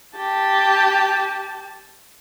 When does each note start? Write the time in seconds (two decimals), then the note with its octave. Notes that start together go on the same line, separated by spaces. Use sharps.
0.17 G4 A5